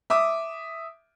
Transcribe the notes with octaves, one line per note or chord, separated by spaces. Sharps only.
E5 D6 D#6